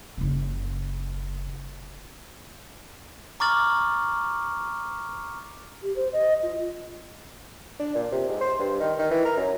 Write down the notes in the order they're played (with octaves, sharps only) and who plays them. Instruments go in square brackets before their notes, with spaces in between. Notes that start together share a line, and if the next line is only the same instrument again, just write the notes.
[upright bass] F#1 C#3
[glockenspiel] A#5 C#6 D6 F6 A6 F#7
[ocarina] G4
C5
D#5
F4
[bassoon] D4
A#2
C3
G#2
C5
G2
D#3
D#3
E3
A#4
F#2